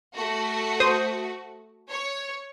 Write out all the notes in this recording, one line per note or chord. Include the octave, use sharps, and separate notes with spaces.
A3 F#4
C5 D#6
C#5